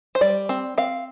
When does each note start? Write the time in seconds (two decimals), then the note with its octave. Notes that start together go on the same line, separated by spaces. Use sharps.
0.15 C5
0.21 G3 D5
0.49 C4
0.78 C4 F5